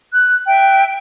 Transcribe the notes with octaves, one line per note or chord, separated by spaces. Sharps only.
F#6
E5 G5